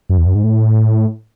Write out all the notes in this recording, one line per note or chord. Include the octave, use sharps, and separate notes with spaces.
F#2
E2
F#2
G#2
A2